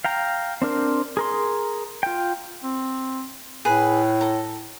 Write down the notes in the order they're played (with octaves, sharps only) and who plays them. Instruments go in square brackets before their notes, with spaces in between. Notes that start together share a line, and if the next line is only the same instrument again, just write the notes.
[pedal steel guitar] F5 G5 A#5
C4 D4 A#4 C5
G#4 A#4 C6
F4 G5
[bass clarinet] C4
[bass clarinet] A2 [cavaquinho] G#4 B4
[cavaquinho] A4 A#5